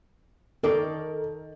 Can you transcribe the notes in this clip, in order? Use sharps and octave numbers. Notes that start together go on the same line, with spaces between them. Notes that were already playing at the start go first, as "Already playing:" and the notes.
D#3 D#4 A4 A#4 D5